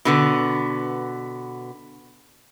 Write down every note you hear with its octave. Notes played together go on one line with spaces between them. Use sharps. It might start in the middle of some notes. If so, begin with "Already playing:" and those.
B2 D3 B3